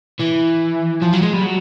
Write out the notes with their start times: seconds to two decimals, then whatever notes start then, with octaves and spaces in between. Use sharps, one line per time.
0.19 E3
1.02 F3
1.13 F#3
1.23 G#3
1.34 G3
1.44 F#3